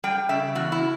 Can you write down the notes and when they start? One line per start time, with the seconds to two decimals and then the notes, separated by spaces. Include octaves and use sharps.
0.04 G3 G5
0.29 C#3 E5
0.55 E2 F#4
0.72 E4